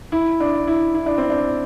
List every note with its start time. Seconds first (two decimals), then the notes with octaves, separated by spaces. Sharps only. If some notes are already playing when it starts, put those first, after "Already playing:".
0.12 E4
0.40 D4
0.68 E4
0.95 E4
1.06 D4
1.18 C4
1.30 D4